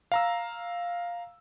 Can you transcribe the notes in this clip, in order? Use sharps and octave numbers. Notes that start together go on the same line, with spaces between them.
F5 A#5 E6